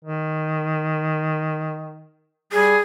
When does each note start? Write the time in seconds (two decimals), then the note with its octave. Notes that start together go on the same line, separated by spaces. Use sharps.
0.05 D#3
2.53 G3 G#4